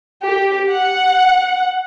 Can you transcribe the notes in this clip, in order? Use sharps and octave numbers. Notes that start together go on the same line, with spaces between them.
G4
F#5